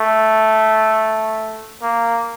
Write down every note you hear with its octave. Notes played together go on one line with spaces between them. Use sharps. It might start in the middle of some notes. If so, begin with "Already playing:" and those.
Already playing: A3
A#3